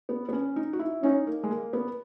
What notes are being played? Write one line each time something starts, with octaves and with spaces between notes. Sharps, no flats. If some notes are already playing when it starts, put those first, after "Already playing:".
B3
B3
C#4
D#4
F#4
E4
C#4 D#4
A#3
G#3
A#3
B3